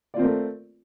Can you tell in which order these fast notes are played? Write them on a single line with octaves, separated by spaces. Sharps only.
D5 F4 C4 A#4 A3